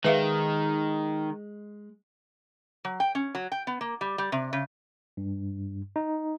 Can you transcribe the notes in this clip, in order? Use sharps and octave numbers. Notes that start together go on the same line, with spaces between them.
D#3 G#3 B4 E5 F5
F#3
G5
C#4
F#3
G5
B3
A#3
G3
G3
C3
C#3
G2
D#4